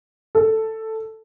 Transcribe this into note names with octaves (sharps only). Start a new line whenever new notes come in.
A4